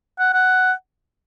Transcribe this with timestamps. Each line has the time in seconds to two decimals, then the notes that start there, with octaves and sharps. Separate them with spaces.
0.19 F#5
0.34 F#5